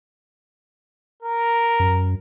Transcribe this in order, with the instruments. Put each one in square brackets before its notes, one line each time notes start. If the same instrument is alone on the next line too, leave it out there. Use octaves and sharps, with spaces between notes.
[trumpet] A#4
[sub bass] F#2